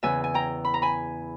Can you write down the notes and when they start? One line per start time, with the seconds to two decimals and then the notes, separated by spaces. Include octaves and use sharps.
0.03 E2 C#3 E3 E5 G#5
0.24 G#5
0.34 G5 A#5
0.65 B5
0.74 A#5
0.82 G#5 B5